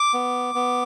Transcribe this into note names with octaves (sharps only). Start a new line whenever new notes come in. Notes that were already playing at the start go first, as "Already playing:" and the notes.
Already playing: D6
B3
B3